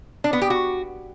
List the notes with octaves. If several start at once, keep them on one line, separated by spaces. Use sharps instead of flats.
D4
B3
G4
F#4